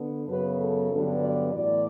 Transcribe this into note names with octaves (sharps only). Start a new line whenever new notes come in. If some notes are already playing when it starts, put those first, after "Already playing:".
Already playing: D3 B3
F#2 C#3 F#3 B3 B4
A4
G2 D3 F#3 B3
D5
A2 E3 B3 D5